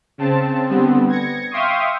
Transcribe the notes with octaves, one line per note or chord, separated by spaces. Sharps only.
C#3 C4 A5
D3 G3 B3 C4
G#6 A#6 C#7
E5 F5 G5 C6 C#6 D#6